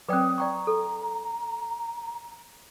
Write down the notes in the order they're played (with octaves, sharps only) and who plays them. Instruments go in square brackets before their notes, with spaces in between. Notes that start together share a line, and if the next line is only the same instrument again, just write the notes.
[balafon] F#3 C4 [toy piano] B4 D5 G5 [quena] D#6
[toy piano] D5 G5 C#6 [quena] A#5
[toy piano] A4